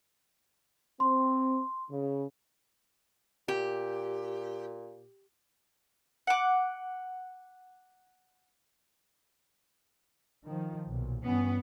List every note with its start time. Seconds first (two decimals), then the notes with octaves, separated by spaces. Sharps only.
1.00 C4 C6
1.90 C#3
3.48 A#2 G4
6.27 F#5 D6
10.45 D#3 F3
10.86 B1 A#2
11.24 G2 E3 B3 C#4